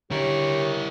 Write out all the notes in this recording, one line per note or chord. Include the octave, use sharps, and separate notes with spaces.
D3 E4 G4 A#4 C#5